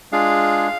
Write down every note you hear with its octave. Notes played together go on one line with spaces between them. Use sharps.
G#3 D4 F4 G#4 F5